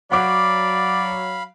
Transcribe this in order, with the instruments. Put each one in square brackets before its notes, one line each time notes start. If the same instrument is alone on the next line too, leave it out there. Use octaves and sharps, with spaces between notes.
[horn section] F#3 [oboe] D5 [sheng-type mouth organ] F5 B5 [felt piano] F#5 D6